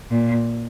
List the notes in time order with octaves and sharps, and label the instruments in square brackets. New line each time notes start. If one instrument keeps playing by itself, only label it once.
[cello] A#2